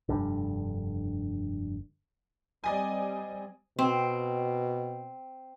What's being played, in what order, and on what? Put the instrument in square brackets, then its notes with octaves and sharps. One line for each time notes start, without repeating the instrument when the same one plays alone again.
[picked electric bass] F1 G2 D3
[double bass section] G3 C4 [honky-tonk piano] D5 D#5 G#5
[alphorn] B2 [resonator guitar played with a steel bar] C4